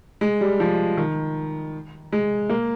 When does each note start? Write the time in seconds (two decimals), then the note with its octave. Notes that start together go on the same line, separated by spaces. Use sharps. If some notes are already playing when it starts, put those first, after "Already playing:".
0.21 G#3
0.41 G3
0.60 F3
0.97 D#3
2.12 G#3
2.49 A#3